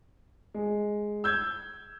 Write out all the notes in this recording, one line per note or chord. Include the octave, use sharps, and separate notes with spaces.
G#3
E6 G6 G#6